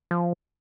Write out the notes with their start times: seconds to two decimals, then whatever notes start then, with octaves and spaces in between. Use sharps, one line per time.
0.11 F3